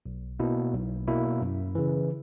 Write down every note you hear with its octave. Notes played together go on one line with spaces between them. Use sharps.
B1
B2 A#3 E4
B1
B2 A#3 E4
F#2
C#3 E3